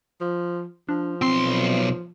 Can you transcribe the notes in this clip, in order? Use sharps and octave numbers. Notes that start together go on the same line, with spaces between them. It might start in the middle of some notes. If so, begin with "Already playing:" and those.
F3
F3 D4
B1 C4 C6